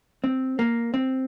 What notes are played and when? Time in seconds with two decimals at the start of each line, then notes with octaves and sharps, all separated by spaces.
0.24 C4
0.59 A#3
0.94 C4